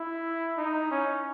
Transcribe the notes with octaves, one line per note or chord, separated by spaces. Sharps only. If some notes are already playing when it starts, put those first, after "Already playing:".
Already playing: E4
D#4
C#4